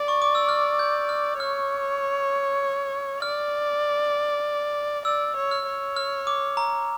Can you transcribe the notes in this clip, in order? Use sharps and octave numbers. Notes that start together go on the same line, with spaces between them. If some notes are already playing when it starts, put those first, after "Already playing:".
Already playing: D5
C#6
D6
E6
F6
G6
F6
C#5 F6
D5 F6
D5 E6
C#5
F6
C#5
F6
D6
A#5